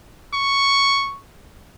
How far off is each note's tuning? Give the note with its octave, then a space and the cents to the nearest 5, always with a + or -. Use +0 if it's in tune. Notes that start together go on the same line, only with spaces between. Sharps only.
C#6 +0